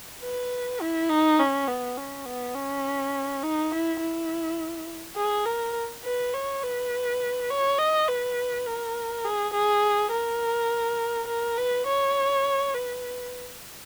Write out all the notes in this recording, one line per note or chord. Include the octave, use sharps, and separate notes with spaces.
B4
E4
D#4
C#4
B3
C#4
B3
C#4
D#4
E4
E4
G#4
A#4
B4
C#5
B4
C#5
D#5
B4
A#4
G#4
G#4
A#4
A#4
B4
C#5
B4